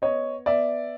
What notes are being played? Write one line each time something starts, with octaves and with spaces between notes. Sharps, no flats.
B3 C#5 D#5
B3 D5 E5